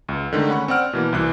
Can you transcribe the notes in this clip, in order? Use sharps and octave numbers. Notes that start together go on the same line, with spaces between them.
C#2
D3 D#3 G#3 A3
C#4 F#5 B5 C#6
C4 D5 F#5 F6 D7
B2 E3 A#3
C2 E3 F#6